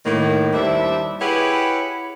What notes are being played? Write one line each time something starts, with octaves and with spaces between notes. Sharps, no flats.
A2 D#3 A#3
D#2 G3 D4 E4 C5 E5
E4 G4 G#4 B4 C#5 F#5